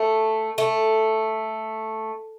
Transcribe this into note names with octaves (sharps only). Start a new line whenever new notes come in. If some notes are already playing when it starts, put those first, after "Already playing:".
Already playing: A3
A3